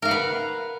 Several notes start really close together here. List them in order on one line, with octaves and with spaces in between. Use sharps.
A#4 F5 F#5 B4